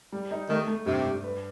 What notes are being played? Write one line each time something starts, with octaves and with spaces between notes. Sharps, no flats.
G3
D#4
D#3 A3
A3
G2 C3
G2
B4